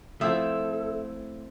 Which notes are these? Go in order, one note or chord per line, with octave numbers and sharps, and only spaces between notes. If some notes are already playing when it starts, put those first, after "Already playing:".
F3 A3 C4 E4 A4 C5 E5 D#6